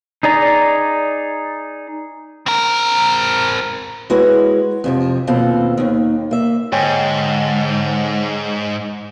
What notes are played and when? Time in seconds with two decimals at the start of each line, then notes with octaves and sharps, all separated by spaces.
0.23 D#4 G#4 D5 A#5
2.46 C4 A#4
4.10 G#3 E4 F#4 B4 C#5
4.84 F2 C3 F3
5.27 D#2 B2 C4 F4 A4
5.77 D#2 D#3
6.31 A#3 E5
6.72 G#2 D3 C#5 G5 G#5